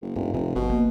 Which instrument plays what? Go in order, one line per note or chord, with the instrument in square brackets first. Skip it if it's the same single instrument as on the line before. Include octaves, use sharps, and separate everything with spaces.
[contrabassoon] F#1
[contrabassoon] F1 [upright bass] G2
[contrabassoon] F1 [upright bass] C3 F3
[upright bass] G1 [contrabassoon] B2
[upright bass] A#3